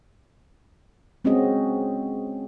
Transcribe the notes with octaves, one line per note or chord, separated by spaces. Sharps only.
G#3 C4 C#4 F#4 G#4 D#5